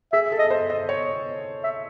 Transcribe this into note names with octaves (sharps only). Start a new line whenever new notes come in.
G#4 E5
A4
D#5
C5
D#5
C#5
E5